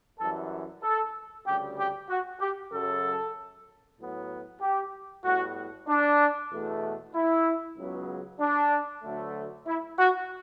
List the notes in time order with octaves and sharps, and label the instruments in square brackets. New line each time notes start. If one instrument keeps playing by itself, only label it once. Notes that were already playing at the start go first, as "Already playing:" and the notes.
[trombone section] F#2 E3 G3 A4
A4
D2 C#3 G3 G4
G4
F#4
G4
F#2 C#3 F#3 A4
A2 F#3 B3
G4
A2 G3 B3 F#4
D4
E2 B2 A3
E4
C#2 C#3 F#3 B3
D4
D2 D3 F#3 A3
E4
F#4